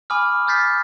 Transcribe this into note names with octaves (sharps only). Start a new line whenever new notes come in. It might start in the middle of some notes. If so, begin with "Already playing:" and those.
G#5 B5 D6 D#6 F6
D#6 F6 G6 A6 B6 C7